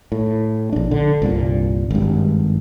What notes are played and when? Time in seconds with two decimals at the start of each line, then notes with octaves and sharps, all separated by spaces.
0.12 A2
0.73 A#1 D4
0.91 D3
1.22 C2 G2 A#2
1.91 G#1 G2